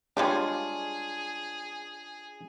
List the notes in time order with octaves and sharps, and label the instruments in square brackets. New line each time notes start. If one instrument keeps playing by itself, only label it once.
[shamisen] G3 G#3 G4 [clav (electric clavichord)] D4 F4 C#5 [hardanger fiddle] G#4